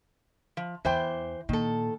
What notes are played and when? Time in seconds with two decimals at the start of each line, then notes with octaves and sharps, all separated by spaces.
0.57 F3
0.85 E2 E3 C5 G5
1.49 A#2 D#3 A4